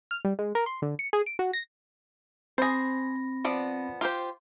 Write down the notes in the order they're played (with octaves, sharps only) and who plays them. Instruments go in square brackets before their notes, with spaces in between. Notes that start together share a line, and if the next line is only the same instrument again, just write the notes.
[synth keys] F6
G3
G#3
A#4
C6
D3
C#7
G#4
D7
F#4
A#6
[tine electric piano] C4 B5 A#6 [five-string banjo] G#4 C5
[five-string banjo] F3 B3 D5
F4 G4 C5